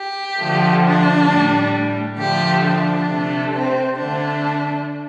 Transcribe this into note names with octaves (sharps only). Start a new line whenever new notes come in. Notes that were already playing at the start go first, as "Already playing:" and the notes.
Already playing: G4
D3 F3 A3
D4
A2 G3
D3 F3 A3 G4
D4
C3 A3
C4
D3 A3 D4